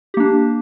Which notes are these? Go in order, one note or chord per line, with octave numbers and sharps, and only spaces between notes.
A#3 D4 G4